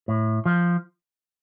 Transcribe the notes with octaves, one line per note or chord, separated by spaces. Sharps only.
A2
F3